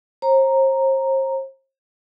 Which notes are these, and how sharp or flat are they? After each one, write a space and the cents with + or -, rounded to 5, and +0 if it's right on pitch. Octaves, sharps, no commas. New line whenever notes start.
C5 +40 A#5 +0